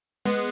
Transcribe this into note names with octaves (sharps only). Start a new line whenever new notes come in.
G#3 B3